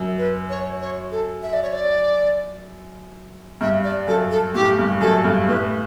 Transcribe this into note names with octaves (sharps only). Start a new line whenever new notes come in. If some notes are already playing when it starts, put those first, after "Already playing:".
Already playing: F#2
B4
C#5
C#5
A4
E5
D5
C#5
D5
G2 E5
D5
F#2 A4
A4
A2 G4
G2
F#2 A4
G2
A2 B4